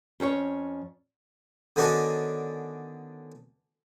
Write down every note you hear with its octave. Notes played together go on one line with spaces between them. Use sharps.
F2 C#4 A4 C#5
D3 D#3 B3 C#4 D4 F#4